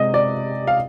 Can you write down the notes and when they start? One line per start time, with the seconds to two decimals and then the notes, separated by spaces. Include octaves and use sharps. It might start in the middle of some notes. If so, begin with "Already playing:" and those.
Already playing: C3 G#3 D#5
0.14 D5
0.68 F5